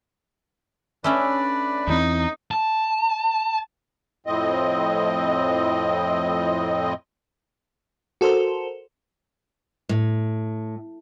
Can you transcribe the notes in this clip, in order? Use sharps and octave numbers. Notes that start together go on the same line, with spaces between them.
A3 C#4 D4 B4 D5 E5
E2 E3 C4 D#4
A5
F2 A2 C4 D#5
F#4 A4 A#4 C5
A2